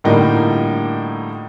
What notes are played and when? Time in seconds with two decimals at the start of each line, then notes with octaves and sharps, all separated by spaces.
0.04 A2 D3 G3 A#3 D#4 F4